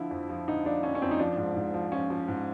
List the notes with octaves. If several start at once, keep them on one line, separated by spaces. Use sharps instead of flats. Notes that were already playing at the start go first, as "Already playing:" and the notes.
Already playing: D3 F3 E4
F2
F3
D3 D#4
F3 D4
D3 C#4
C#4
F2 C4
D#4
F3 D4
G#2
G#2
F3
F3 C#4
F3
G#2